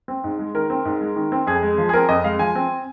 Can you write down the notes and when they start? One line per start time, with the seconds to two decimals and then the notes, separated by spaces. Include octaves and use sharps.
0.08 C4
0.24 G#2
0.39 G#3
0.54 D#3 A#4
0.70 C4
0.85 G#2
1.01 G#3
1.16 D#3
1.32 C4
1.47 F2 G#4
1.63 G#3
1.78 F3
1.89 G#4
1.94 C4 A#4
2.09 F2 D#5
2.24 G#3 F5
2.39 F3 G#5
2.55 C4